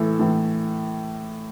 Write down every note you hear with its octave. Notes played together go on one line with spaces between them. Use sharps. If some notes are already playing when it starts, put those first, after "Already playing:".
Already playing: A2 E3 A4
A2 E3